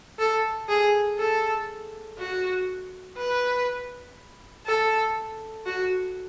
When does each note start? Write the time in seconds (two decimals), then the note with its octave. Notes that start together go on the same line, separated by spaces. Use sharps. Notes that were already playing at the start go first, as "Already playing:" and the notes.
0.19 A4
0.68 G#4
1.18 A4
2.18 F#4
3.17 B4
4.66 A4
5.66 F#4